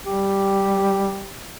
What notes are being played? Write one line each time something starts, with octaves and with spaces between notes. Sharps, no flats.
G3 G4